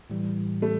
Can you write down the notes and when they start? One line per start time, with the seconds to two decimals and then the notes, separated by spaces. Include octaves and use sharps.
0.10 A2 E3 G3
0.62 A3